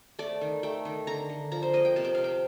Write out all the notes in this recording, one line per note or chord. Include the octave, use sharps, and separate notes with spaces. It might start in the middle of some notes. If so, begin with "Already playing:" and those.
A3 D5
D#3
A3 G5
D#3
D3 A#5
D3
F3 A#5
C5
A#3 D#5
G5
C3 A5
G5
C3 F5
G5